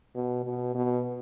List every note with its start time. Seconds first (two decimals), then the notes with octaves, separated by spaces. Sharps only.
0.15 B2
0.44 B2
0.75 B2